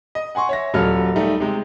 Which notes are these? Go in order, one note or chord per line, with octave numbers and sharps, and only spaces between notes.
D#5
F#5 G#5 C6 C#6
C#5 E5 A#6
D#1 F#3 A4 F6
G3 A3 D#4
C3 G#3